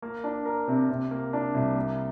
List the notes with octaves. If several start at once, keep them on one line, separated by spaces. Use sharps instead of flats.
A#3
D4
A#4
C3
C3
A#3
D4
C2
A#3